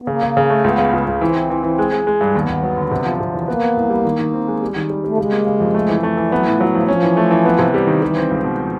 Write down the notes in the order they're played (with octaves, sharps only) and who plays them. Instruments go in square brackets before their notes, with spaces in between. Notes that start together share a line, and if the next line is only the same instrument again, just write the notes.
[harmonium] B3
[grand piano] C#3 [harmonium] A#3
[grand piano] C#3
C#3
A3
[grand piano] C#2 [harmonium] B3
[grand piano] C#3
C#2
C#2
[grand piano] E3 [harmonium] C4
[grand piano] E3
E3
E3
G#3
G#3
G#3
G2
[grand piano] D#2 [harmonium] B3
[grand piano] D#2
F#3
D3
C3
F3
C3
E2
[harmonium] A#3 [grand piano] B3
[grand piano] B3
C2
G3
D#3
D#3
C4
G#3
G3
D#3
G3
[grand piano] G3 [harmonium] A3
[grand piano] C#3 [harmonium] G#3
[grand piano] A#3
C#3
F2
A3
E3
A3
E3
[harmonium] G3
[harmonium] F#3 [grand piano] B3
[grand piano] A2 [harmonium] F3
[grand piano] F#3
[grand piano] A2 [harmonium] F3
[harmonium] F3 [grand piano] C#4
[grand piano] E3
A3
E3
B3
C3
G3
D#3
[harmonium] E3 [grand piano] G3
[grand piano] C4
C#2
B2
[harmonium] F3